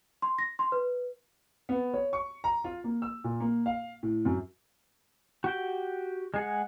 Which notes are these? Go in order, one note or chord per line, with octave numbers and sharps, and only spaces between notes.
C6
A#6
C6
B4
B3
C#5
C#6
A#5
F4
A#3
E6
A#2
A#3
F5
A2
F#2
F#4 G4 G5
G#3 G#4 F#5